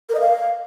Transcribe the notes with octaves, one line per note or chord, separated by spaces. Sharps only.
A#4
D#5
F5